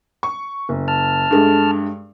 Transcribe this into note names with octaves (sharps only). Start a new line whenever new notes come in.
C#6
F#1
A5 F6
G2 G#3 A3